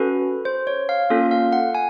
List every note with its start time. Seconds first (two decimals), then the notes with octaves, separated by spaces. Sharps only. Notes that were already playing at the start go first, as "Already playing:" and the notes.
Already playing: C#4 F#4 A4 B4
0.45 C5
0.67 C#5
0.89 F5
1.10 A#3 C#4 F4 A4
1.31 F5
1.53 F#5
1.75 G#5